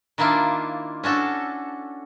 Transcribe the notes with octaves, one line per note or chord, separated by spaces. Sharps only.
D#3 A#3 D4 E4 F4
C#4 D4 F#4 A4